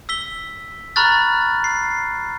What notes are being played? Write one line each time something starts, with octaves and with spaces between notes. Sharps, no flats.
E6 B6 G7
A#5 B5 C#6 F6 F#6 A6
C7